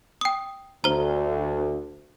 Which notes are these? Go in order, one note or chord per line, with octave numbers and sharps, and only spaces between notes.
G5 D#6
D2 C5 A#5